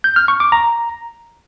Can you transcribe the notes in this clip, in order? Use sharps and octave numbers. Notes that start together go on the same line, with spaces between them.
G6
F6
C#6
D6
A#5